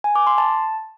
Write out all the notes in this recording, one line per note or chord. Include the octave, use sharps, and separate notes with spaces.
G#5
D6
C6
A5